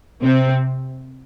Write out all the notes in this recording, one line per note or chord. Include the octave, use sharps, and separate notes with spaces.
C3 C4